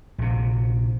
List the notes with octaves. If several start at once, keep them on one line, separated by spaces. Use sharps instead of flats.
A#1 C3